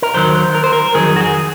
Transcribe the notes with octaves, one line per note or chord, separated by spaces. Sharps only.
A#4
D#2 D#3 F#3 C5
A#4
C5
A#4
F2 D#3 F#3 G#4
F#4
G#4